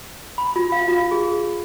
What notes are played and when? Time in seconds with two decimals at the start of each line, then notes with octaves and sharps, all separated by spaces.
0.38 B5
0.56 F4
0.72 F5
0.88 F4
1.11 G#4